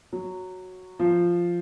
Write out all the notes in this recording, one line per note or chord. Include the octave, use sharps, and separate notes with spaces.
F#3
F3